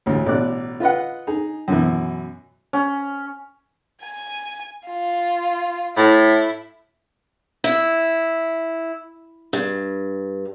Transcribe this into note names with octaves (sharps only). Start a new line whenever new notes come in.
A1 D2
A1 B2 D5 D6 F#6
F4 B4 D#5 F#5
D#4 G#4
F#2 B2 E3
C#4
G#5
F4
A2 E4
E4
G2